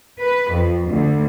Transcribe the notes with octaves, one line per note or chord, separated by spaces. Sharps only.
B4
F2
D2